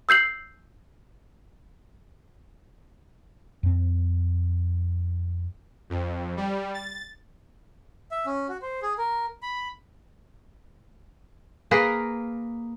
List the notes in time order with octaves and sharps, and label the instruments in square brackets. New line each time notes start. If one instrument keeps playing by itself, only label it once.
[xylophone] E6 G6 C7 F#7
[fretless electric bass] F2 C4
[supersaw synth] F2
G3
A6
[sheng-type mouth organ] E5
C#4
F#4
C5
G#4
A#4
B5
[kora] A#3 G#4 A#4 B4